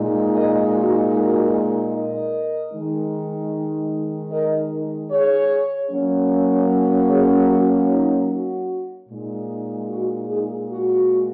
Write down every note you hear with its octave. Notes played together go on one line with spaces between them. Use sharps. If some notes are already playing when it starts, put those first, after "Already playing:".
Already playing: A#2 G#3 D#4
A#4 D#5
F#4
F#4 A#4
A#4 D#5
D#3 G#3 D#4
A#4 D#5
G#4 C#5
F#3 A#3 C#4
G#4 C#5
F#4
D#4
F#4
A#2 G#3 D#4
F#4
D#4 G#4
F#4